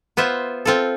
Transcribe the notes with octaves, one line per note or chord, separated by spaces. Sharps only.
B3 F4 C5 E5
C4 F4 A4